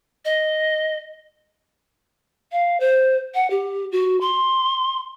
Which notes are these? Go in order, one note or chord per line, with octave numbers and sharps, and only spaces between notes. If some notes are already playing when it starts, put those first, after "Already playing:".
D#5
F5
C5
F#5
G4
F#4
C6